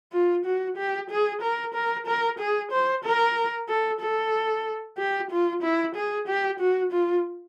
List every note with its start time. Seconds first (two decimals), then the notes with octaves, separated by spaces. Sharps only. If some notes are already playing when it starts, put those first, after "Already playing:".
0.12 F4
0.45 F#4
0.77 G4
1.10 G#4
1.42 A#4
1.74 A#4
2.06 A#4
2.39 G#4
2.71 C5
3.04 A#4
3.68 A4
4.00 A4
4.98 G4
5.31 F4
5.62 E4
5.95 G#4
6.27 G4
6.59 F#4
6.92 F4